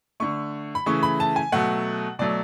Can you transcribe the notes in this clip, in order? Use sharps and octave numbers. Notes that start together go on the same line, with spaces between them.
D3 A3 C#6
B5
C#3 E3 A3 C#6
B5
A5
G#5
B2 F#3 A3 F#5
B2 F#3 A3 D5